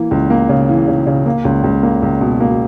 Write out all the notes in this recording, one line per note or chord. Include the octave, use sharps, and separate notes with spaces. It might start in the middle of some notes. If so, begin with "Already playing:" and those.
Already playing: E3 A#3
C#2
A#3
C#3
E3
C#3
C#3
A#3
C#2
C#2
A#3
C#2
B2
A#3